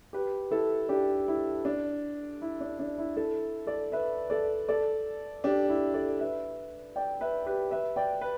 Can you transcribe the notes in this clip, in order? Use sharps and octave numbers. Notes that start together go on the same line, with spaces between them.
G4 B4
E4 A4
D4 G4
E4
D4
E4
D4
D4
E4
E4 A4
A4 D5
B4 E5
A4 D5
A4 D5
D4 G4
E4
A4 D5
B4 E5
D5 G5
B4 E5
G4 B4
B4 E5
D5 G5
B4